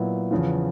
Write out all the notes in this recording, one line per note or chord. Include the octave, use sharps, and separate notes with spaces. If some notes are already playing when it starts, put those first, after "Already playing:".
Already playing: A#2 F#3 B3 E4
E2 C#3 F3